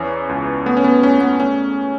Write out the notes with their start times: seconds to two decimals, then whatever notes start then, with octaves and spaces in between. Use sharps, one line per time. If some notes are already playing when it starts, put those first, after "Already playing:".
Already playing: E2 E3 C#4
0.29 C#2
0.66 A3 B3
0.77 C#4
0.84 B3
1.03 E2 C#4
1.21 B3
1.40 A3 C#4